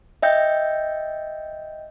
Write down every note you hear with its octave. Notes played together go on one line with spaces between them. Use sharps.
D#5 E5 G5 G6